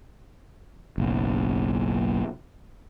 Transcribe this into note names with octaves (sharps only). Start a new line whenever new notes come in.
F#1 B1